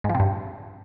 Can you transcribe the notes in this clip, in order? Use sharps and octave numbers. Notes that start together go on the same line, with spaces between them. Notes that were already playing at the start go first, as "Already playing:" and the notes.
G#2
F3
C3
G2